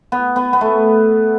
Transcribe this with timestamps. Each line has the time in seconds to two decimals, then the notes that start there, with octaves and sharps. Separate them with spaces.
0.12 B3
0.36 B3
0.53 B3
0.61 A3